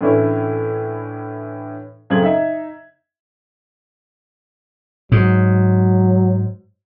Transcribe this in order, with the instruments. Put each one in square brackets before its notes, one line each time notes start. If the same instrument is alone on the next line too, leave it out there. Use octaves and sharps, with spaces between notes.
[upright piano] A2 D3 E3 C#4 E4
F#2 C#3 A3 C4 G#6 F#7
D#4 E5
[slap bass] G#2 [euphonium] F#3